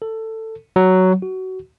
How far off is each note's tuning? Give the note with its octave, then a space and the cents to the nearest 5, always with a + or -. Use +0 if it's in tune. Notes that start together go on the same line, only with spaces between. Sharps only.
A4 +15
F#3 +10
F#4 +20